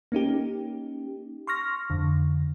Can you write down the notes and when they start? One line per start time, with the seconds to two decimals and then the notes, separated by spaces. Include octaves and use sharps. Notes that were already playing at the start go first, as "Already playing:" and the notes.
0.12 A#3 C#4 D#4 G4
1.47 C6 C#6 F6 A#6
1.90 F2 D3